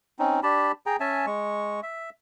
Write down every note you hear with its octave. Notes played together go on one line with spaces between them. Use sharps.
C4 C#4 D#4
D4 G4 A5 B5
G#4 G5 A#5
C#4 E5 G#5 A5
G#3 C#6
E5